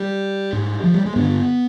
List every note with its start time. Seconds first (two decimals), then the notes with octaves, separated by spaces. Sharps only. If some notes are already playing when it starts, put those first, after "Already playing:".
Already playing: G3
0.53 G#2
0.84 F3
0.94 G3
1.06 G#3
1.16 G2 D3 B3